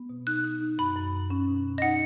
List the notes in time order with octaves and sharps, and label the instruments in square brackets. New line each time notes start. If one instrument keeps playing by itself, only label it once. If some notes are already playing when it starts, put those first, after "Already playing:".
Already playing: [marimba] B3
B2
[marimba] D#4 [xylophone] F#6
[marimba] D#4
D#4
[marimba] F#2 [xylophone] B5
[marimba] F#2
F#2
C#4
B2
B2
[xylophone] D#5
[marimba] D#4 [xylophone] F#5